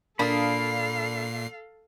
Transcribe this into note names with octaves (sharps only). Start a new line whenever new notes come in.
A#2 A#3 D4 A4 F5 B5 D#6 C7